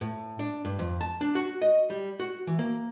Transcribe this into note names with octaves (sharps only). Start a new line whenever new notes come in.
A2
D4
G2
F2
A5
D4
F#4
D#5
G3
F#4
E3
A#3